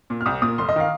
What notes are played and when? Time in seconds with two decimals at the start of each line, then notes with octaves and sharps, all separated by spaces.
0.10 A#2
0.21 F6
0.26 C2 D#6
0.42 A#2 D#6
0.58 F1 C6
0.69 D#5
0.76 D#3 F5